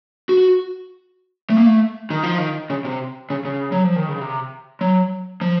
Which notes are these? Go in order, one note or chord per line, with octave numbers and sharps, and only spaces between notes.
F#4
A3
A#3
A3
D#3
F3
D#3
C#3
C3
C#3
C#3
F#3
F3
D#3
C#3
C3
F#3
F3